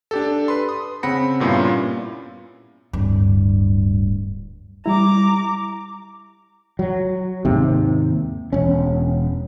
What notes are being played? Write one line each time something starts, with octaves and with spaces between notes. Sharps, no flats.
D4 G4 A4
B4 B5 C6
D#6
C#3 C4 F#5 B5 A#6 C#7
G2 A#2 B3 C#4 E4 F4
D1 G2
G3 E4 A#5 D6
F#3
D#2 G#2 C3
E1 C#4